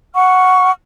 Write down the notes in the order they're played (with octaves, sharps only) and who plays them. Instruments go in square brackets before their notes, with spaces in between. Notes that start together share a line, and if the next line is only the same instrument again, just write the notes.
[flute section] F#5 C#6 F6